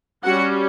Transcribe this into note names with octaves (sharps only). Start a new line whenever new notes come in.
G3 C#4 F#4 F#5